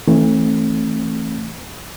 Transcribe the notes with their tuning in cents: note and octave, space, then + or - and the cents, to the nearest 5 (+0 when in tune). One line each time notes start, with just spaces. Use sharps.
E3 -25 A3 +5 C4 +45